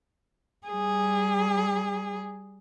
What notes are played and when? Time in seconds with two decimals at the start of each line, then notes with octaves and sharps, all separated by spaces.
0.67 G3 G#4